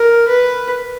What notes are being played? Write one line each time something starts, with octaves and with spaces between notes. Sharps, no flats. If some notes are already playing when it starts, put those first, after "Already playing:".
Already playing: A#4
B4